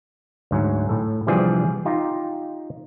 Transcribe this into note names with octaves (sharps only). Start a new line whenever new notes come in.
D2 G#2 F#3
A2 A4
C3 E3 F3 G3 D4 G#4
D#4 F4 G4